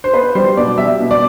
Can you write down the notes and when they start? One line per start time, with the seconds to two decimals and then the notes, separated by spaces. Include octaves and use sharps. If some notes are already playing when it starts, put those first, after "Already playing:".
0.04 C5
0.14 B3 B4
0.35 G3 C5
0.57 B2 D5
0.78 G3 E5
1.00 B2
1.11 D5